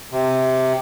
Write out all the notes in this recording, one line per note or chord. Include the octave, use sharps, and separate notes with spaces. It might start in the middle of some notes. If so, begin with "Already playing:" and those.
C3